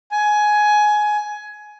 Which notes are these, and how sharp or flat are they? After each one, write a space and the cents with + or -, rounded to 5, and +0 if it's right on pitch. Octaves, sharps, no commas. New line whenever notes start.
G#5 +15